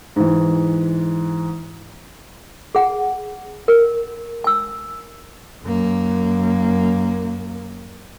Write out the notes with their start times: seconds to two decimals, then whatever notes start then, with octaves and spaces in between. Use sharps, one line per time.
0.16 G#2 E3
2.75 G#4 F#5
3.68 A#4
4.44 G#5 E6
5.64 F#2 A#3